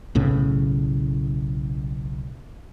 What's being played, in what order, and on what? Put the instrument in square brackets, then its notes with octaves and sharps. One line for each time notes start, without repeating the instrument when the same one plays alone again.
[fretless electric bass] B1 A2 C#3